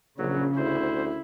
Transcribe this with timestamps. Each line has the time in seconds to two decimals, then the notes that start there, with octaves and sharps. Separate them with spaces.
0.18 A#1 C#3 F#3
0.57 D2 E4 C5